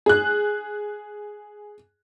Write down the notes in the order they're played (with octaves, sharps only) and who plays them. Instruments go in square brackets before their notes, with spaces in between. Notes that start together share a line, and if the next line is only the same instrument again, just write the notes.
[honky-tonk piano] G#4 F#6